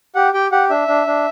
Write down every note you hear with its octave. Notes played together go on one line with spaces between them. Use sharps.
G4 F#5
G4 G5
G4 F#5
D4 E5
D4
D4